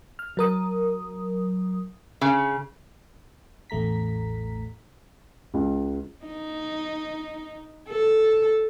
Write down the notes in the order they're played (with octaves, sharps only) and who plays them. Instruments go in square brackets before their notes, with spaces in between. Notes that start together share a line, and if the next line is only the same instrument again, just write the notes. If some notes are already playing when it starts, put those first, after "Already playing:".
[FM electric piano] F6
F#3 A#4 D#6
[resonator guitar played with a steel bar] C#3
[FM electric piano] A1 E2 A3 A#5 B6
[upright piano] C#2
[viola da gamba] D#4
A4